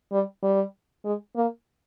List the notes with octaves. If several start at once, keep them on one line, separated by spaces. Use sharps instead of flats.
G3
G3
G#3
A#3